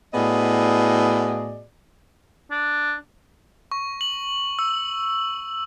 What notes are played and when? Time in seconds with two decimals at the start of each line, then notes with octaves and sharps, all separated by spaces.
0.14 A2 B3 F#4 G#4 D5 D#5
2.51 D4
3.71 C#6
4.01 F#7
4.59 E6